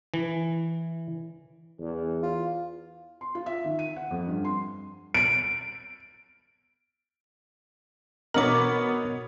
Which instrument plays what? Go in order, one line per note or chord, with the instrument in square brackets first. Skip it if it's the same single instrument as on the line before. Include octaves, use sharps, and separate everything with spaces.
[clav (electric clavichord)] E3
[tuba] E2
[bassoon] F4
[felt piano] C6
F4
E5
D#3
D#7
F#5
F2
G2
C6
[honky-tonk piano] D7
[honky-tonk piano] B2 B3 [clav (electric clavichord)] A#4 [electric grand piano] C#5 D#5 [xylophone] D6 F#7